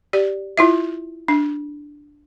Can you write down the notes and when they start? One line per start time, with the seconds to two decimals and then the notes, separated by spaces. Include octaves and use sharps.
0.13 G4 D5
0.58 E4 F4 E5
1.28 D4